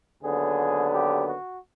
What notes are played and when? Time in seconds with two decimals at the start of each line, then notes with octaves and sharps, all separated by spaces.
0.23 D#2 D3 F#3 B3 G#4
0.92 G4
1.27 F#4